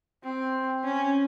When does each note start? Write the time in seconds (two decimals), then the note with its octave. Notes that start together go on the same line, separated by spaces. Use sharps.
0.23 C4
0.84 C#4